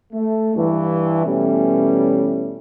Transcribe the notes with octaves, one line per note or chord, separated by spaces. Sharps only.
A3
G2 E3
B2 E3 G3 A3 C#4